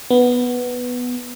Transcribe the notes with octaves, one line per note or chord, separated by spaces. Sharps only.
B3